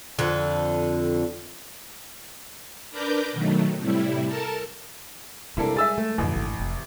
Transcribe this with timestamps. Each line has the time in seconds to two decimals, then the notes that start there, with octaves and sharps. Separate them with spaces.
0.19 F2 D3
2.91 D4 A#4 B4 A#5 D6 G6
3.33 B2 D#3 F#3 A3
3.79 A2 C3 G3 E4
4.28 A4 A#4 A5
5.57 C3 G3 G#3 A#3 D4 E4 A4
5.76 G#4 E5 E6 A6
5.98 A3
6.18 A1 F2 G#2 B2 D3
6.35 G#1
6.59 F1 C3